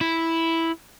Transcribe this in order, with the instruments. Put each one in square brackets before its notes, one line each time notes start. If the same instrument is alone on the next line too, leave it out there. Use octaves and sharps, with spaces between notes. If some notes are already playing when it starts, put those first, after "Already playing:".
[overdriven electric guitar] E4